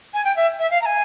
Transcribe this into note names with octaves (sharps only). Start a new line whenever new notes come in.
G#5
G5
E5
E5
F5
A#5
G#5